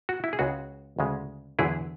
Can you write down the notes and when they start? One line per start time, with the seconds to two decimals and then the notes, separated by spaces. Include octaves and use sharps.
0.09 F#4
0.24 E4
0.33 G#4
0.39 C#2 C#3 G#3 F#4
0.99 D2 C#3 G#3
1.59 E2 D3 F#3 E4 G#4